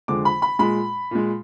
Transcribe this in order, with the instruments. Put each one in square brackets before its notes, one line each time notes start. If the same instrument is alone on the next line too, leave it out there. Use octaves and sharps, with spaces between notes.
[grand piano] F2 D3 G#3 D6
B5
B5
A#2 G#3 B5
A#2 G#3